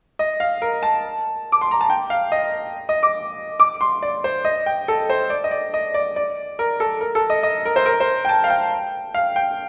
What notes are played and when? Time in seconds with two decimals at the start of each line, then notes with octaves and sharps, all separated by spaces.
0.19 D#5
0.40 F5
0.62 A#4
0.83 A5
1.52 D6
1.61 C6
1.71 A#5
1.81 A5
1.90 G5
2.10 F5
2.32 D#5
2.89 D#5
3.03 D6
3.60 D6
3.81 C6
4.03 D5
4.24 C5
4.45 D#5
4.66 G5
4.88 A4
5.10 C5
5.30 D5
5.44 D#5
5.51 D5
5.74 D#5
5.94 D5
6.16 D5
6.59 A#4
6.80 A4
7.01 A#4
7.15 A4
7.30 D#5
7.43 D#5
7.66 A#4
7.76 C5
7.86 A#4
8.00 C5
8.25 G5
8.29 A5
8.44 F5
8.50 G5
9.14 F5
9.36 G5